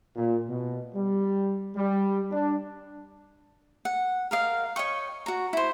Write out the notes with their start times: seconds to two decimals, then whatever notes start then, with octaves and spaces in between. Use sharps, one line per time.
0.16 A#2
0.48 B2
0.95 G3
1.77 G3
2.31 D4
3.85 F#5
4.31 A#4 D#5 F5
4.76 C#5 D#5 G5 C#6
5.26 F#4 A#5
5.53 E4 C5